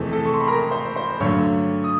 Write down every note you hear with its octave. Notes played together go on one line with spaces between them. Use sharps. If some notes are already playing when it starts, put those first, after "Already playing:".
Already playing: F2 C3 E3 A3 G#4
A4 A5
C#6
C6
B5
A#4 A#5
C5 C6
C5 C6
G2 D3 F#3 A3 C#5 C#6
D#6